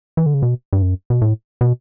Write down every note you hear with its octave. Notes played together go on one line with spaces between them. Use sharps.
E3
D3
C#3
B2
G2
F#2
B2
A2
B2